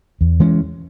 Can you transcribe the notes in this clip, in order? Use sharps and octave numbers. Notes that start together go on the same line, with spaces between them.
E2
E3 G#3 C#4